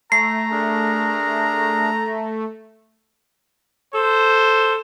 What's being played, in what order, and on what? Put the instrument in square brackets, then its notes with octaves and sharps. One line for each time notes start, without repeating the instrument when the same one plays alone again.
[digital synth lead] A3 [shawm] A#5 [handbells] C7
[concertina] D4 G#4 A#4
[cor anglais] A4 [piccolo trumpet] C5